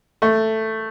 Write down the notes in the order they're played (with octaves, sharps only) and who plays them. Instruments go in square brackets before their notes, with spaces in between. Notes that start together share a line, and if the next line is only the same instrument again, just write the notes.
[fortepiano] A3